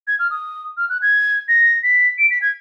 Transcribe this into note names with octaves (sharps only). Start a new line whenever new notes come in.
G#6
F6
D#6
F6
F#6
G#6
A#6
B6
D7
B6
G#6